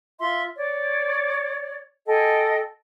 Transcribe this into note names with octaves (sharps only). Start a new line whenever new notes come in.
F4 E5 C6
C#5 D5
A4 D#5 G5 G#5